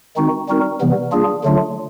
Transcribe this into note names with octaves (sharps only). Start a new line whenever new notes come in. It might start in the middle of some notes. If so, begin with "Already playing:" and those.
D#3 G#3 C4 D#4 F#4
G3 C4 D#4 F#4 A#4
C3 E3 G3 B3
G3 A#3 D4 F4 G#4
D3 F#3 A3 D4 F4